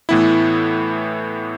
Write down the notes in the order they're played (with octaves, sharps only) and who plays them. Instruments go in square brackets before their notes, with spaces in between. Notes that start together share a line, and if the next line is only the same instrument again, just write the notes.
[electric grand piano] A2 E3 B3 E4